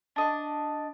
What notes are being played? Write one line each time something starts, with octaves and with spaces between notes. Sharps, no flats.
D4 D#5